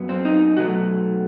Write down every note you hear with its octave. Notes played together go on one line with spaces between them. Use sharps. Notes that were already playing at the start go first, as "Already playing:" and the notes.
Already playing: F#2 F#3 B3
C4
D#4
B2 F#3 A3 F#4